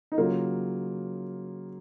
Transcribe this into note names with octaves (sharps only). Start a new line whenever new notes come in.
D#4
C#3 F#3 A#3 F4